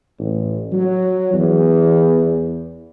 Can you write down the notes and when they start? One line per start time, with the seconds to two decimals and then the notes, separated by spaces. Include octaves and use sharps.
0.19 A1
0.73 F#3
1.33 E2